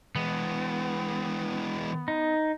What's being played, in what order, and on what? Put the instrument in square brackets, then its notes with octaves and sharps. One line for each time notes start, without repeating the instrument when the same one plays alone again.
[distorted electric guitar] E3 G#3 [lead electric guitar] B3
[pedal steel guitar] D#4